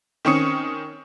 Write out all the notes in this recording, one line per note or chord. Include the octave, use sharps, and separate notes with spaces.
D#3 C4 C#4 C#6 D#6 C#7